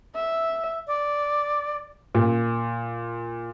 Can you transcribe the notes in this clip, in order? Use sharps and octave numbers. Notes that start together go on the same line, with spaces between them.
E5
D5
A#2